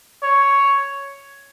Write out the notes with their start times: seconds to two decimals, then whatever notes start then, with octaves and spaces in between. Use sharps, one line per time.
0.23 C#5